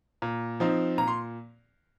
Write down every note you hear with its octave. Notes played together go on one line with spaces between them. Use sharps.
A#2
F3 C4 D#4
A#2 A#5
C6